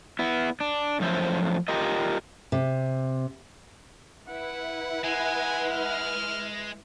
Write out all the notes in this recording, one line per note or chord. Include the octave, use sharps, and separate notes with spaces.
B3 E4
D4
F#2 A2 F3 C5 E5
F4 G4 A#4 D#5
C3
E4 B4 F#5
G#3 F#5 G#5
F6